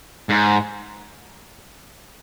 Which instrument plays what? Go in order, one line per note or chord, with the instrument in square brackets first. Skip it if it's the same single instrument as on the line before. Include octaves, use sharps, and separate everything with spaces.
[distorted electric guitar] G#2